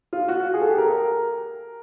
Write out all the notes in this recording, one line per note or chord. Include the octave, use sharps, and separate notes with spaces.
F4
F#4
G#4
A4
G4
A#4